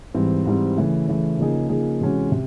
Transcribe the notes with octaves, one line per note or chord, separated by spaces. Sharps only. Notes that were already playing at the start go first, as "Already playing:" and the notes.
G#2 E3 G3 C4
G#2 E3 G3 C4
C#3 E3 A3
C#3 E3 A3
C#3 F3 A#3 D#4 G#4
C#3 F3 A#3 D#4 G#4
C3 E3 G#3 C#4 F#4
C3